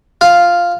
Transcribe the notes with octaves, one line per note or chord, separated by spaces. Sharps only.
F4